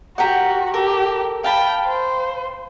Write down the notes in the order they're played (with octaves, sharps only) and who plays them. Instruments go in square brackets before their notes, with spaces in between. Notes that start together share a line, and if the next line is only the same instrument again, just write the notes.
[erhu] F#4 [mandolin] G4 A#4 F#5
[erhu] G4 [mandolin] A4 A#4
[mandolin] F5 A5 B5 [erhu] G5
[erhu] C5